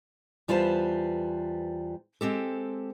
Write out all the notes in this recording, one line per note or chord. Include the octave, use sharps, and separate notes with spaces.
E2 G3 F4 B4 C5 A5
G#3 C4 G4 A4